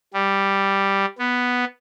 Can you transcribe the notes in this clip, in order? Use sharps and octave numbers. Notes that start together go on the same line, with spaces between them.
G3
B3